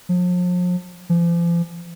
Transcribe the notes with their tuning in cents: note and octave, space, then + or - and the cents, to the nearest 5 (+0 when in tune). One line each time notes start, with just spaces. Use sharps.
F3 +40
F3 -40